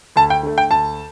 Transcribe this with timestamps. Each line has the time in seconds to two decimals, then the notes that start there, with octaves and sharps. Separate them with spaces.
0.16 D2 A5
0.30 G5
0.43 D3 A3
0.58 G5
0.70 D2 A5